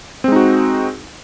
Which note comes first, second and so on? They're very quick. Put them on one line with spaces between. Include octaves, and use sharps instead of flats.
C4 G#3 D#4 F#4